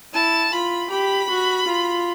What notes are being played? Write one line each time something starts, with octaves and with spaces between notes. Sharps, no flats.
E4 A5
F4 B5
G4 B5
F#4
F4